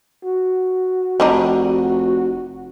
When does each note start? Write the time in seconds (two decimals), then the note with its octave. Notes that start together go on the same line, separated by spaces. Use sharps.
0.24 F#4
1.20 F1 G3 D4 D#4